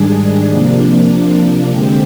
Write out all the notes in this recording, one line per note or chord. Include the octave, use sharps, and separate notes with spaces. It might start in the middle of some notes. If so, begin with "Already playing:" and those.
Already playing: G#2 D#3 G3 D4 G#4
C3 F3 A#3 D4
D3 G#3 C4 G4